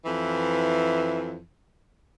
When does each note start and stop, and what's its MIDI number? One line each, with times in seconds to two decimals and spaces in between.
0.04 1.39 41
0.04 1.39 52